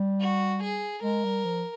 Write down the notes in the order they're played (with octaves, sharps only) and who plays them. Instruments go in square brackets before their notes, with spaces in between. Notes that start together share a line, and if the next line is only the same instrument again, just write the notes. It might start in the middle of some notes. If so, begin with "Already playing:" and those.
Already playing: [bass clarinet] G3
[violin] F#4
G#4
[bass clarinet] G#3 [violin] A#4
[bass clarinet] G3
F3